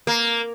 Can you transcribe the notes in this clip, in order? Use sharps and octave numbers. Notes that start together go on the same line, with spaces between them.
A#3